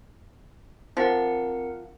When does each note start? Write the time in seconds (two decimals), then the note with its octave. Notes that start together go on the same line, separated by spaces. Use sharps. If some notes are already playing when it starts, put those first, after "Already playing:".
0.97 F3 C4 A#4 F#5